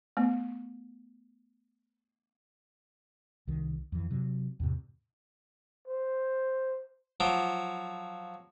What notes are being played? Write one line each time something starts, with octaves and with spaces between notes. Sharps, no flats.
A3 B3
C2 D#3
F2 E3
C3 F#3
E2 A2 C3
C5
F3 F#3 D6